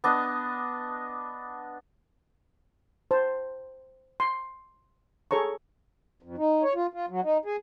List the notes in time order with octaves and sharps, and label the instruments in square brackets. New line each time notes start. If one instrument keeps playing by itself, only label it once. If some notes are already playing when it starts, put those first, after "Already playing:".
[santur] B3 D4 D#5
[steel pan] C5 A5
C6
G#4 A4 C#5 A#5 C#6
[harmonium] F2
D#4
C#5
F4
F4
F#3
D#4
G#4